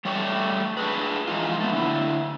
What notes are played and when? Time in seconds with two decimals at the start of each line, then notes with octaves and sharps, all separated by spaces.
0.05 G3 A3 C#5 D5
0.77 D4 G#4 B4
1.28 E3 F3 G#3 D#4 F4
1.60 A3 B3
1.73 D3 F#3 E4